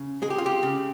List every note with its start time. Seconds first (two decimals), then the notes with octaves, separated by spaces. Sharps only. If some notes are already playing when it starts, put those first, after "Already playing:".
Already playing: C#3
0.22 G#3 G#4
0.30 G4
0.38 F4
0.46 G4
0.63 C#3